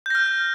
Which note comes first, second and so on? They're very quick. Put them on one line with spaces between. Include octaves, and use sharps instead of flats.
G6 A#6 F6